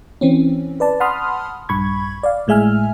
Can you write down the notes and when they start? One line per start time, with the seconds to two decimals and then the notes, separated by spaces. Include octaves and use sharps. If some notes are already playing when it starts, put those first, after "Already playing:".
0.21 E3 C4 C#4
0.80 B4 D5 A5
1.00 F#5 A5 B5 C6 D#6 F6
1.69 A#1 G2 B5 C#6 G#6
2.23 D5 F5
2.47 G#1 A2 G#3 E5 G#5 F6